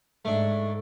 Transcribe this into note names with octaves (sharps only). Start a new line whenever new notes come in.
G#2 A3 D4